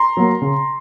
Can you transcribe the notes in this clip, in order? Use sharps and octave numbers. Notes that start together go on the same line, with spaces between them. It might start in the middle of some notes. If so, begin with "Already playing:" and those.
Already playing: A#5 C6
F#3 A#3
C#3